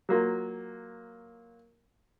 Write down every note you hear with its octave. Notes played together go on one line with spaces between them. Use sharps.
F#3 A#3 F4